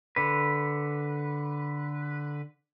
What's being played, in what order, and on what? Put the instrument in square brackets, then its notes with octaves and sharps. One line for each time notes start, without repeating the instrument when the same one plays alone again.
[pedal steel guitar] D3 B4